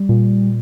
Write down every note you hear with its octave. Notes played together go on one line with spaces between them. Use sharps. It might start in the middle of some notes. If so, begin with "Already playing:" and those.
Already playing: G3
A#2